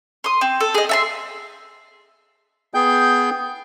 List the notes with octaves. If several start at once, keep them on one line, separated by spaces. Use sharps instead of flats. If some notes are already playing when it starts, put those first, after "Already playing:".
C6 D#6
C4
A4
G#4 D#5
E5 A5 C6
B3 G#4 G5 G6